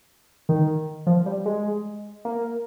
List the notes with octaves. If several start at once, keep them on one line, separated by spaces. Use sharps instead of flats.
D#3
F3
G3
G#3
A#3